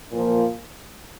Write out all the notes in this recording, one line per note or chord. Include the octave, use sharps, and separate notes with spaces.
A#2 F3 A#3